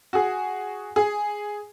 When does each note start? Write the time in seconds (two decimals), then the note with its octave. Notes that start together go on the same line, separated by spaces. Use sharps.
0.13 F#4 G#4
0.96 G#4